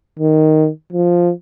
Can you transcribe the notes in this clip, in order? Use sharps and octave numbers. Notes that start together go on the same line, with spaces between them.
D#3
F3